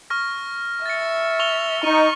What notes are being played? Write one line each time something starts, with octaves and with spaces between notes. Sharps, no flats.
C#6 F6 A#6
E5 A6 C#7
C#6 F7 G7
D#4 C#6 D#7